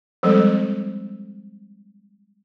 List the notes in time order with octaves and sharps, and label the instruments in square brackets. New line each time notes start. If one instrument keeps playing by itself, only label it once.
[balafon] F3 G3 G#3 C4 A4